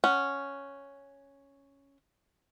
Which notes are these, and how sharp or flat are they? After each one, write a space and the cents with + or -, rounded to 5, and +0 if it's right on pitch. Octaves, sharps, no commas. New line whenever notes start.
C#4 +0 F#5 +0